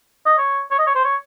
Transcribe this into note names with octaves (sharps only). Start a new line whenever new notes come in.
D#5
C#5
C#5
D#5
C#5
C5
C#5